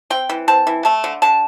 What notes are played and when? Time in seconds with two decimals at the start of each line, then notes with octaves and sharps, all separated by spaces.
0.10 C4 G5
0.29 E3
0.48 C4 A5
0.67 E3
0.85 A3 A5
1.04 D3
1.22 D3 A5